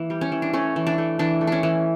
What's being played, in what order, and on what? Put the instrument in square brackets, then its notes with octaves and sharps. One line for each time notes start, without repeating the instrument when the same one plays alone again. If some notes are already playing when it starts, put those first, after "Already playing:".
Already playing: [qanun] E3 A#3
G3
C#4
E3
D4
A3 C#4
E3
D4
A3
E3 D4
A3
C#4 D4
E3